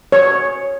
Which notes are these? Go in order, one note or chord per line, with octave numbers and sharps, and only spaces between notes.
C#5